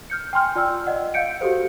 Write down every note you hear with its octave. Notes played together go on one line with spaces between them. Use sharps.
F6 G6 C#7
G5 G#5 C6 F6
F4 D5 G5 E6
D5 D#5 F#5
F5 F#5 G6 C#7 D7
F#4 G4 A4 C5